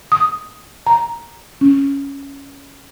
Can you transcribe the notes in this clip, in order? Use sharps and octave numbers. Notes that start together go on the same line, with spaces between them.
D#6
A#5
C#4